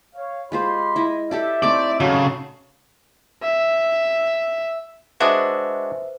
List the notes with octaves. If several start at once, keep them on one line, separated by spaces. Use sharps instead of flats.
C#5 F5
G#3 F4 G4 C5 B5 C6
E4 D#5
E4 G4 A4 D5 E5
A3 C4 D#4 D5
C#3 F#3 A4
E5
G#3 D4 F#4 B4 C5 E5 D#6